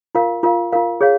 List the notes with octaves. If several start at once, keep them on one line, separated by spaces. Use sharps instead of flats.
F4 A#4 F5
F4 A#4 F5
F4 A#4 F5
G#4 C#5 F5